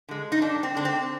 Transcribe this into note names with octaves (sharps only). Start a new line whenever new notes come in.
D3 G#3
D#4
G2 D4
C4
D3 G#3 D4
C4